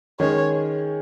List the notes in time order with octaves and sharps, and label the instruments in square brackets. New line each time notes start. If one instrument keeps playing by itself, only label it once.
[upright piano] D#3 G#3 C#4 G#4 [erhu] C#5